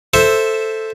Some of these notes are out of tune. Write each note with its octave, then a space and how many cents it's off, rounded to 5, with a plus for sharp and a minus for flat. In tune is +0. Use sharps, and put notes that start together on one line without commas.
A4 +0 C5 +0 E5 -5